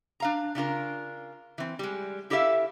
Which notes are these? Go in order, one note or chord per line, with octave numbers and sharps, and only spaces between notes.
D4 F5 A#5
C#3 D4 F4 A#4
E3 C4
G3 G#3
E4 G4 A4 D5 E5 F5